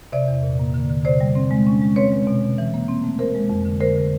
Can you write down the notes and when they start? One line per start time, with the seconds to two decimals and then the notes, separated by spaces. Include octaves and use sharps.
0.12 C3 D5 E5
0.28 E2
0.43 A#2
0.59 A#3
0.74 D3
0.89 D3
1.05 C3 C5 D5
1.21 G3
1.35 C4
1.51 G#3
1.67 C#4
1.82 G#3
1.96 C4 B4 C#5
2.12 G#3
2.27 B2
2.43 B2
2.58 E3
2.74 A#3
2.89 C4
3.04 A3
3.19 E3 A#4 C5
3.35 G#3
3.50 F2
3.65 D3
3.80 D3 A#4 C5
3.96 D3